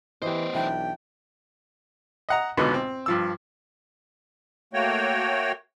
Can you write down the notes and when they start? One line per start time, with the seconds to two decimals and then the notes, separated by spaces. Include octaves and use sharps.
0.22 E3 B3 G4 C5 D#5
0.55 B1 E3 D4 G5
2.29 D#5 F#5 A#5
2.57 C#2 G#2 B2 D3 B3
2.74 C4
3.06 G2 F3 E6
4.73 A3 A#3 F#4 C#5 G5